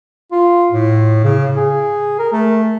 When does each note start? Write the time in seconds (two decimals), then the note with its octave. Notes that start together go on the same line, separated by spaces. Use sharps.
0.32 F4
0.72 A2
1.24 C#3
1.57 G#4
2.19 A#4
2.33 A3